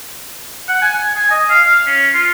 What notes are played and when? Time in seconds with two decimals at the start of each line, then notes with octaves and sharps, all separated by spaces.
0.69 F#5
0.82 G#5
1.16 G#5
1.30 D#5
1.50 F5
1.66 F5
1.87 C#4
2.14 F4